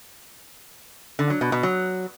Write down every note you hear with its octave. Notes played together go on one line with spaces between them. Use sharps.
D3
F#3
B2
B2
F#3